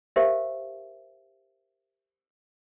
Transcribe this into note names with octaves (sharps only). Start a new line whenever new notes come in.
G4 A#4 C5 E5 F5